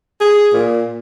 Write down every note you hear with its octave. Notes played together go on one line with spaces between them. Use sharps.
G#4
A#2